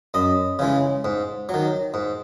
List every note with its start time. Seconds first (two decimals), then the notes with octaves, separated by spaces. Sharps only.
0.14 F#2 D#5
0.59 C#3 E3 G#3
1.05 G#2
1.49 F#3
1.54 D#3
1.94 G#2